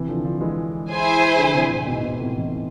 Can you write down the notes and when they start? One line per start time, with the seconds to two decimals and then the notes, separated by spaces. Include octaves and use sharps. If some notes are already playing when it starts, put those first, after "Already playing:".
Already playing: C3 E3
0.08 D3 F3
0.24 D3 F3
0.41 E3 G#3
0.90 E4 G#4 C5 G#5
1.38 D3 F3
1.54 C3 E3
1.70 A2 C3
1.86 G#2 B2
2.04 G#2 B2
2.20 A2 C3
2.36 C3 E3